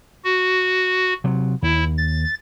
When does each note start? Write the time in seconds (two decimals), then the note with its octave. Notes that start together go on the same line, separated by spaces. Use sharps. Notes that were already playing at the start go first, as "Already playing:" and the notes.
0.24 F#4
1.24 C3 F#3
1.62 D#2 E4
1.97 A6